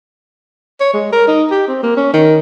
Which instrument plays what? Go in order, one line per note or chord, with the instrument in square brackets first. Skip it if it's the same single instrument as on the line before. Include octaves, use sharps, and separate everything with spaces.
[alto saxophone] C#5
G#3
A#4
D#4
G4
C4
A#3
C#4
D#3